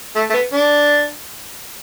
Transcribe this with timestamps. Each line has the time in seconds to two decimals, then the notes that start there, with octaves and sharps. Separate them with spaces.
0.16 A3
0.30 A3
0.34 B3
0.53 D4